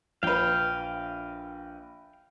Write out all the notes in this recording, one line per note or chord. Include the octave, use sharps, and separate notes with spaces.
A#1 B4 F5 G5